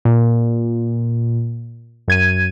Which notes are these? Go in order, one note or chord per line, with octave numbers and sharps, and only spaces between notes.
A#2
F#2 G#6 D#7